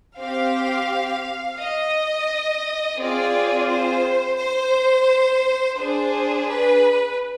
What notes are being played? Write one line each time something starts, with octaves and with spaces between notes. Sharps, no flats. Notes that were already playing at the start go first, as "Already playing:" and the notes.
C4 G4 F5
D#5
C4 F4 G#4 D5
C5
C5
D4 G#4 C5
B4